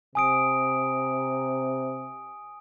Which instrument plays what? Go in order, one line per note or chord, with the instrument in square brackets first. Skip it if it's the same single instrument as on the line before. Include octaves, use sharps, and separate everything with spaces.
[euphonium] C3 [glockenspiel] G#5 D#6 D7